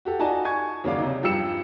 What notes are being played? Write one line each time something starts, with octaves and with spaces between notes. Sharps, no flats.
F#4 G4 A4
D#4 F4 F#4 D5 G#5 A5
G#5 C#6 G#6
D#2 C#3 F#3 D5 F5 D6
C3 D#4
G2 F3 G4 E6 C#7 E7